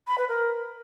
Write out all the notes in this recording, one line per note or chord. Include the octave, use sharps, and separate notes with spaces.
B5
B4
A#4